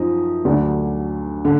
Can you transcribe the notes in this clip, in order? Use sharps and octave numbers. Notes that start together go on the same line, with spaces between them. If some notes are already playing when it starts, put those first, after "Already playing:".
Already playing: F#2 F3 D#4
D2 D3 F#3 D4
D3